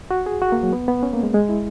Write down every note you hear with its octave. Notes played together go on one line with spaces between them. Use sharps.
F#4
G#4
F#4
A#3
F#3
B3
B3
C#4
A#3
G#3
G#3
E4